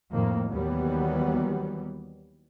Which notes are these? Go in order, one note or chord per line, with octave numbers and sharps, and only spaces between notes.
F2 A2 D#3 A#3
D#2 E3 F#3 G3 B3